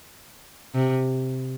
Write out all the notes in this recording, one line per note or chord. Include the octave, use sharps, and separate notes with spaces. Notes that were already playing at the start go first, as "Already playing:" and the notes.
C3